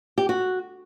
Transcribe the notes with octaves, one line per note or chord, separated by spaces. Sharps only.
G4
F#4